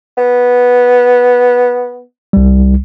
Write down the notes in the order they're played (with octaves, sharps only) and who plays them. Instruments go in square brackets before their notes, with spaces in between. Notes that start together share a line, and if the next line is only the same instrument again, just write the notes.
[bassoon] B3
[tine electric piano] C2 G3